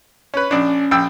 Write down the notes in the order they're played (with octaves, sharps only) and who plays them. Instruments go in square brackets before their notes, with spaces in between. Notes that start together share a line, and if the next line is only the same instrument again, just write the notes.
[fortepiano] C#4 B4
[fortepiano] A#1 D4 [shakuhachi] C#4
[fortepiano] A#1 G5 E6